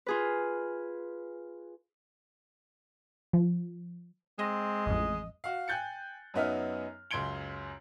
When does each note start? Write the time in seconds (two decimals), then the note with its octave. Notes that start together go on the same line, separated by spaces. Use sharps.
0.06 F4 G#4 B4
3.33 F3
4.39 G#3 C4 D#5
4.86 A1 F2 D#5
5.44 F#4 F5
5.68 G5 G#5 F#6 G6 A6 C#7
6.34 F#2 F#3 B3 D#4 E5 F6
7.11 C#2 F#2 C6 G#6 D7 G7